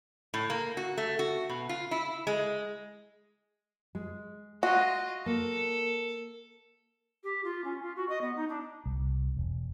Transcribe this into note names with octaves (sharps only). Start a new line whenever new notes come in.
A2
A#3
F#4
A3
F#4
B2
F4
E4
G#3
G#3
F4 F#4 D#5
A#3 A4
G4
F4
C#4
F4
F#4
D#5
B3
D#4
D4
C2
E1